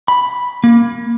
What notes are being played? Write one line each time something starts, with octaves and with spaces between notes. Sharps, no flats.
B5
A#3